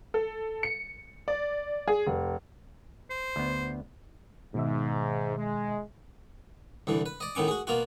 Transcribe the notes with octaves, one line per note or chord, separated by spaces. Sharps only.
A4
C#7
D5
G#4
F1
C5
D2 B3
G#2 B2 D#3 E5
G#3
C2 D3 E3
B4
D5 D#5
A2 D#3 B3 C#4 D6
F#4 G#4
B2 A#3 F4 F#4